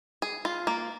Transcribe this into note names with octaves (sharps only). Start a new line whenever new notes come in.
G#4
F4
A#3